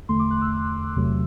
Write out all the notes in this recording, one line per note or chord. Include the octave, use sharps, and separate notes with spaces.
E2 D3 A3 C6
D6
F#6
E6
E2 C3 F#3 A3